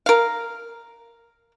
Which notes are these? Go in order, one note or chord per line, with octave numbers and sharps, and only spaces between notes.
A#4 F5